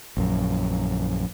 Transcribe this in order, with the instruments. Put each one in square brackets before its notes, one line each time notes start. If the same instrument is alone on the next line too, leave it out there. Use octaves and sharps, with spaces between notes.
[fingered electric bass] A#1 F#2